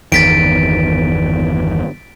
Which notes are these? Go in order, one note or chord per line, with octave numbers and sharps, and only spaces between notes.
G1 E2 D#3 A6 B6 D7